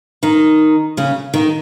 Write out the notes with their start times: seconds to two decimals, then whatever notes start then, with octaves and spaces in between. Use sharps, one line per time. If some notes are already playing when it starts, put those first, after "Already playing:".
0.23 D#3 D#4
0.97 C#3 C#4
1.34 D#3 D#4